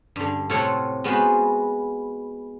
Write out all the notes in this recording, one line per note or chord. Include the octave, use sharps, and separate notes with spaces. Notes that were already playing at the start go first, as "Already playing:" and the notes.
G2 D3
A2 C3 F4 A4 C#5 F#5
G#3 B3 F4 F#4 C5 B5